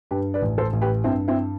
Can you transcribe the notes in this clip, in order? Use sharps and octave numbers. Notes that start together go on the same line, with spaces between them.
G2 G4 B4
B4 D5
A1
A4 C5
A1
G4 B4
G2 C4 E4
C4 E4